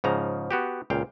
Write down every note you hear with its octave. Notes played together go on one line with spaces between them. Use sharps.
G#2 C#3 F3 A#5
B3 F#4 G4
C#2 A#2 F5 G5